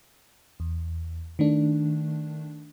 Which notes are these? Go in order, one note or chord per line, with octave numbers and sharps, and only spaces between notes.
E2
D#3 A3 D4